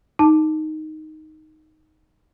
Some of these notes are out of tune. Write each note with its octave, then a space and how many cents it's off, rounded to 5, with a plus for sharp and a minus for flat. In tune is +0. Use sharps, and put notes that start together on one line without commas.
D#4 +0 A5 +0